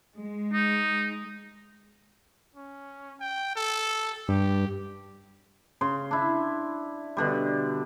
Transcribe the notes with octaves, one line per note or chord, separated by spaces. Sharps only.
G#3
D#4
C#4
G5
A4
G2 G4
C#3 C6
D4 E4
B2 D3 G3